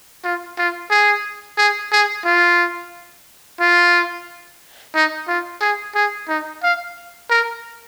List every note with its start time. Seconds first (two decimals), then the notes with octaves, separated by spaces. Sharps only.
0.24 F4
0.58 F4
0.91 G#4
1.58 G#4
1.92 G#4
2.25 F4
3.60 F4
4.95 D#4
5.28 F4
5.61 G#4
5.95 G#4
6.28 D#4
6.63 F5
7.30 A#4